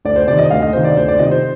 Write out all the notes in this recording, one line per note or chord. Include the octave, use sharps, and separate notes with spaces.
D2 D5
C5
C3 D#3 D5
D#5
D2 F5
D#5
C3 D#3 C5
D5
D2 C5
D5
C3 D#3 D#5
C5